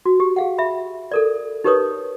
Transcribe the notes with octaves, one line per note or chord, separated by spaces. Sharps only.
F#4
G4
G#4 F5 F#5
E5 B5
A4 A#4 D5
D#4 G4 A#4 B4 C#5 D#6